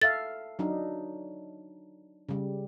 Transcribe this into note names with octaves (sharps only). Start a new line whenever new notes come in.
A4 E5 F5 A6
F#3 D4 D#4
C#3 G3